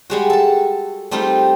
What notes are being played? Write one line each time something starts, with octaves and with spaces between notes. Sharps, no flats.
G3 G#3 F#4
A4 A5
G3 A3 C4 D#4 F4